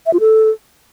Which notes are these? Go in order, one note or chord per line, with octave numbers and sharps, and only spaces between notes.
E5
F4
A4